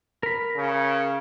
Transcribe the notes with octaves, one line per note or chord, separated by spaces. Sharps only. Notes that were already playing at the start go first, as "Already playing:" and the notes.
A#4 B5
C#3